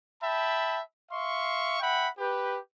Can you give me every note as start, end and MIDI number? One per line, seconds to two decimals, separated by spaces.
0.22 0.80 76
0.22 0.80 79
0.22 0.80 81
0.22 0.80 83
1.11 1.80 76
1.11 1.80 77
1.11 1.80 84
1.11 1.80 85
1.80 2.08 76
1.80 2.08 78
1.80 2.08 79
1.80 2.08 83
2.18 2.58 67
2.18 2.58 71